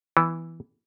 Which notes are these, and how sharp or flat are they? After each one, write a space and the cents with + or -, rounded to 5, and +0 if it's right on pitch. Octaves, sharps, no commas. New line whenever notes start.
E3 +0 B3 +0